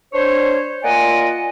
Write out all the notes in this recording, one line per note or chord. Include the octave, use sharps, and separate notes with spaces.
D4 C5 C#5
A#3 F4 D5 D#5 F#5 G#5